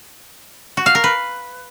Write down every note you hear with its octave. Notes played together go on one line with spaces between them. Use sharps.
F#4
F5
A#4
B4